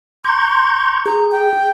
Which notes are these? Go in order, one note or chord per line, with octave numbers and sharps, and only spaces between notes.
A#5 C6 C#6 G6
G#4 A#5
G5